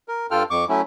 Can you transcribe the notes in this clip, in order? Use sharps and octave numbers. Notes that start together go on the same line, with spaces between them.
A#4
G2 F4 A4 G5 F6
F2 C#6 D6
F#3 A3 C#4 E4